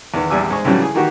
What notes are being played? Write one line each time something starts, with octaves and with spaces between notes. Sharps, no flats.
E2 D#3 B3
A#1 E2 G3 G#5 D6 E6
G#3 C5 C#6
C2 A2 C#3 E3 F#3 G3
G#4
D#3 E3 A#3 F#4 G4